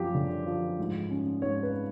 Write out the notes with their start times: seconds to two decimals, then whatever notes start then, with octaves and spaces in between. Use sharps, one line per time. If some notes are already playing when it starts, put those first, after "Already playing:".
Already playing: F#2 F3 G4
0.15 D3
0.46 F3
0.79 G#2
1.10 C#4
1.41 G#2 C#5
1.63 B4